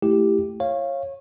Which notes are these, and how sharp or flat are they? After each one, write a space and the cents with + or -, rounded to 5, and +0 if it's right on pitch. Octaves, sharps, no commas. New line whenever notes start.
A3 +5 E4 +0 G4 +0
C#5 -20 F5 -10